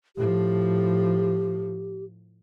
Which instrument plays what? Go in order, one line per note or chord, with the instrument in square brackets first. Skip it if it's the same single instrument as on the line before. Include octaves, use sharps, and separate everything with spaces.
[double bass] A2 F3 [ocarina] G4